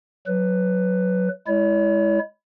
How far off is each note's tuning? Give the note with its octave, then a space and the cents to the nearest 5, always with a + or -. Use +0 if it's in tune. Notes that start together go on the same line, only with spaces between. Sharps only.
F#3 +0 B4 +10
G#3 +0 E4 +0 C#5 +40